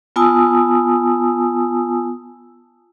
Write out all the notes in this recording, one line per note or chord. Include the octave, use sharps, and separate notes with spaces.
B3 F4 G#5 A5 D#6 E6